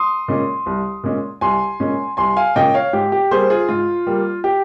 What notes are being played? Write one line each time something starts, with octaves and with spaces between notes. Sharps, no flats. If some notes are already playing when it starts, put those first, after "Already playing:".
Already playing: C6 D#6
A#2 G#3 C#4
C2
A#2 G#3 C#4
C2 G#5 C6
A#2 G#3 C#4
C2 G#5 C6
F5 G#5
A#2 G#3 C#4 D#5 G5
C#5 F5
G#2 G4
G4
G3 A#3 G#4 C5
F4 G#4
G#2 F4
G3 A#3
G4